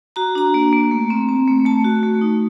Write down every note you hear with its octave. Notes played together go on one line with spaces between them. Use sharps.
F#4 A#5
D4 A#5
A#3
A#3
A3
C4
C4
A3
A3 A5
F#4
A3
D#4